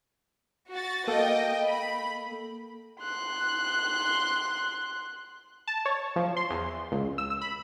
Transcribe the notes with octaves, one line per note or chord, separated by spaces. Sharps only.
F#4 A6
A#3 A4 D#5 G5
B5
C6 F#6
A5
C#5
F3
C6
E2
C#2
E6
E6
B5